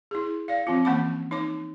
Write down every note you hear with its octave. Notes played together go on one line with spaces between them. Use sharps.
E4 G#4
D5 F5
F3 C4 F4
E3 A#3 C#4 F#5 B5 D6
D#4 C#5 A5 D6